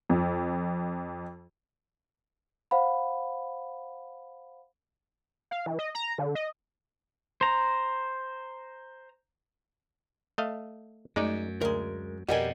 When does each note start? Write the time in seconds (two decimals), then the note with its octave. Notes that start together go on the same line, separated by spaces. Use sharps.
0.09 F2
2.71 C5 F5 F#5 B5
5.51 F5
5.66 E3
5.79 D#5
5.95 A#5
6.18 D3
6.35 D#5
7.41 C5 A#5
10.38 A3 D#5 F5
11.16 F#2 G#3 A3 D#4 D5
11.61 D2 G#3 A#4
12.28 F2 B2 G3 A#4 D5 D#5 F#5 G#5